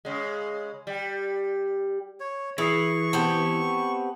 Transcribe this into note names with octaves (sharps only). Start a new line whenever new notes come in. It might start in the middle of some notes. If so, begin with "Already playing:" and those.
C#3 G#3
G3
C#5
E3 E4 G#4 C#6 D#6 C7
B3 C4 G4 A5